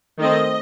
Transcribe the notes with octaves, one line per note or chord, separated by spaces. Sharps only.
D#3 A3 C4 D#5